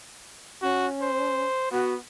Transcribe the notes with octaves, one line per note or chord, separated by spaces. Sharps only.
C#4 F#4
C5
B3 F#4